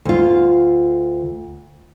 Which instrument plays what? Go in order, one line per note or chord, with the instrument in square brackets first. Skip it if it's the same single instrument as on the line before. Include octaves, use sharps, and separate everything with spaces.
[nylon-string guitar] D2 F4